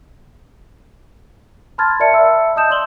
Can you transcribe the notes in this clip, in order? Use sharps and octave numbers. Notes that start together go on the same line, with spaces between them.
A5 B5 C6 F6 G#6 A6
A#4 D5 E5 A5 C#7
E5 A5 B5 E6
D#5 A5 D#6 G6 E7
D5 C6 E6 F#7 G7